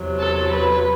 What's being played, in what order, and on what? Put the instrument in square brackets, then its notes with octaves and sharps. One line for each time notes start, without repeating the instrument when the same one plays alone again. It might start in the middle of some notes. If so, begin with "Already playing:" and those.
Already playing: [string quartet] E2 C3 F#3
A4
B4